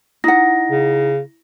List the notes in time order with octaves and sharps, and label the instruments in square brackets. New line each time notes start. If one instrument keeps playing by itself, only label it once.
[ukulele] D#4 F#5 [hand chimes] E4 A#6
[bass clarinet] C#3